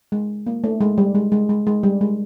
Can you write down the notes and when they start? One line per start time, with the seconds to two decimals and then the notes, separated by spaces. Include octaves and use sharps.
0.12 G#3
0.47 A#3
0.64 A3
0.81 G#3
0.98 G3
1.15 G#3
1.32 G#3
1.49 G#3
1.67 G#3
1.83 G3
2.01 G#3